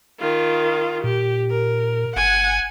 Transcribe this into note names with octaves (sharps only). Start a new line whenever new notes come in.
D#3 F4
A#2 G4
A#4
G1 F#5 G#5